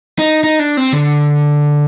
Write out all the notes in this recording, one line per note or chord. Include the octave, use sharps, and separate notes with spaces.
D#4
D#4
D4
C4
D3